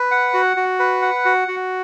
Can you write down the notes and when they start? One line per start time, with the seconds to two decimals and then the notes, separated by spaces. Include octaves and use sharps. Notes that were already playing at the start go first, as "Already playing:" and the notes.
Already playing: B4
0.11 F#5
0.34 F#4
0.57 F#4
0.79 B4
1.02 F#5
1.25 F#4
1.48 F#4